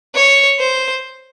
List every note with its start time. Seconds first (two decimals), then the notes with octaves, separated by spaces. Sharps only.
0.15 C#5
0.59 C5